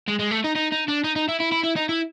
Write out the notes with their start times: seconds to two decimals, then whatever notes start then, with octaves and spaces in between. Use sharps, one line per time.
0.08 G#3
0.19 G#3
0.31 A3
0.44 D#4
0.55 D#4
0.72 D#4
0.88 D4
1.04 D#4
1.16 D#4
1.29 E4
1.40 E4
1.52 E4
1.64 E4
1.76 D#4
1.89 E4